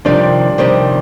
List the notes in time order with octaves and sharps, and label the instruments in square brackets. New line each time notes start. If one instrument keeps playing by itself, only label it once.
[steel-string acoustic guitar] F2 C3 D#3 G3 [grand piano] D4 D5
[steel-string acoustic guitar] F2 C3 D#3 G3 [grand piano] C5